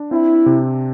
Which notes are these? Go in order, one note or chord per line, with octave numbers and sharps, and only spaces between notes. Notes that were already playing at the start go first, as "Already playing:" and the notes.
Already playing: D4
C4 E4
C3